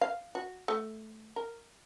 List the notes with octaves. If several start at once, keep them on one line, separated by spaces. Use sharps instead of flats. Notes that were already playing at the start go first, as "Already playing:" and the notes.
F5
F#4
A3
A#4